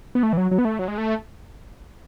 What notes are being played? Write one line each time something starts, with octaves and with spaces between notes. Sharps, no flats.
B3
A3
E3
F#3
F#3
B3
A3
F#3
G#3
A3